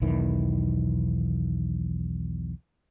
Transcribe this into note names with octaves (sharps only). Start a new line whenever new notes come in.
B1 E2 D#3 E3